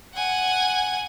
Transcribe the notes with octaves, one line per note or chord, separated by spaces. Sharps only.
F#5 G#5